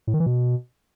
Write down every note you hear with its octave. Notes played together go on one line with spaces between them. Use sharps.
A2
D#3
E3
B2